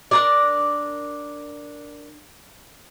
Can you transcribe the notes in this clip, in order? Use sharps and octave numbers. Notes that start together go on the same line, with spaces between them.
D4 A#4 D5